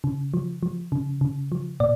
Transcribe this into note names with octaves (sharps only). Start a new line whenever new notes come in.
C#3
F3
F3
C#3
C#3
F3
A#2 D5